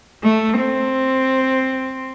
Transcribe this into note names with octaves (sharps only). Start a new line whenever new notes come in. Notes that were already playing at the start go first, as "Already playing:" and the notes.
A3
C4